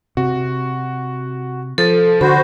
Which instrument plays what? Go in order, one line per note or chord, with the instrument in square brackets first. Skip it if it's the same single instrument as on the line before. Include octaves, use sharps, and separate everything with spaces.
[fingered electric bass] C3 [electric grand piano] F#4
[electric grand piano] F3 A6 [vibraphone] A4
[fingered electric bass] D3 [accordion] F#4 C5 [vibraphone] B5